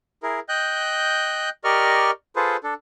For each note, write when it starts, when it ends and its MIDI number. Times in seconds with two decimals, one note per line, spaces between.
0.23 0.40 64
0.23 0.40 68
0.23 0.40 70
0.49 1.50 75
0.49 1.50 79
0.49 1.50 90
0.49 1.50 91
1.64 2.11 67
1.64 2.11 70
1.64 2.11 74
1.64 2.11 75
1.64 2.11 85
1.64 2.11 89
2.36 2.56 65
2.36 2.56 68
2.36 2.56 69
2.36 2.56 71
2.36 2.56 72
2.64 2.74 62
2.64 2.74 69